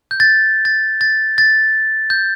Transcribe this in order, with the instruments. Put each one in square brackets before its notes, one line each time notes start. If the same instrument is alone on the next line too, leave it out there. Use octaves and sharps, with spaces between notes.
[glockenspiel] G6
A6
A6
A6
A6
G6